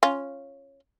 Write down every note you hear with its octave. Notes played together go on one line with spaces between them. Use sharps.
C#4 F4